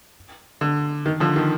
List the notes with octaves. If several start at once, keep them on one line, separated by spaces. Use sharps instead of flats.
D3
D#3
D3 F3
D#3